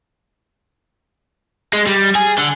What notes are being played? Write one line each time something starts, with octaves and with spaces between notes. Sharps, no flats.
G#3
G3
G#4
D3